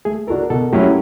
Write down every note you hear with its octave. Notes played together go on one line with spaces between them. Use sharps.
A3 G#4
D4 F#4 A4 A#4
B2 A4
F#3 A3 C#4 E4 G4